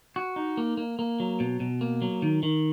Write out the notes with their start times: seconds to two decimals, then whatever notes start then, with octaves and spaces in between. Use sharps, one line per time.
0.16 F#4
0.36 D#4
0.57 A#3
0.77 A#3
0.99 A#3
1.20 F#3
1.40 B2
1.60 B2
1.81 A#3
2.02 F#3
2.22 D#3
2.43 D#3